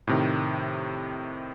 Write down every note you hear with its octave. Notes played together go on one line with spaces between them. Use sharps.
A2 C3 D#3